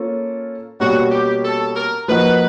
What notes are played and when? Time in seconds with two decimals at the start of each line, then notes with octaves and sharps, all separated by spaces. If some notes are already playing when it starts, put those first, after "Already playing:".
Already playing: A#3 C#4 F4 A4
0.80 B2 G3 A#3 C#4 F#4
1.11 G4
1.45 A4
1.76 A#4
2.08 F3 A#3 D#4 F#4 A#4 B4